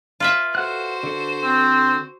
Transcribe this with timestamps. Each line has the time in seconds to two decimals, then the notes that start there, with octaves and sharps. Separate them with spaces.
0.20 F4 B4 E5
0.55 F#4 A4 C5 F#5 F#6
1.03 D3 A4
1.43 C4